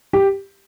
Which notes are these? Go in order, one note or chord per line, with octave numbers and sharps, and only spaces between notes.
G4